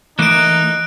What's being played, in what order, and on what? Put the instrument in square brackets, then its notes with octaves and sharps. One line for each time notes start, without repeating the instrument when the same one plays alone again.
[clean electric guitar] E3 A3 A#3 [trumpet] D#4 [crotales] F#6 D7